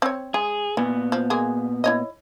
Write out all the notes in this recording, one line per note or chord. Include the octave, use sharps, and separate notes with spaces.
C4 C#5
G#3 G#4
A#2 E3 B3
F3
G#3 A#3 G#4
E4 C#5 D#5